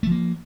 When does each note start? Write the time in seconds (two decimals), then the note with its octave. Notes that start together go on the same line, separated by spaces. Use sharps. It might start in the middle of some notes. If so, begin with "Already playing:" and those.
0.03 A3
0.07 F3
0.11 A#3